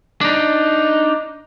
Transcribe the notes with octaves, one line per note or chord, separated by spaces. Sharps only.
D4 D#4